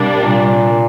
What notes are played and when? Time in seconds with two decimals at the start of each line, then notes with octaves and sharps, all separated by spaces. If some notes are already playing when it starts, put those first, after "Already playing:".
Already playing: C3 G3 A#3 D4
0.15 A#2